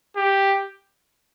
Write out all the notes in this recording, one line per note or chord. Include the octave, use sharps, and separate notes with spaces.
G4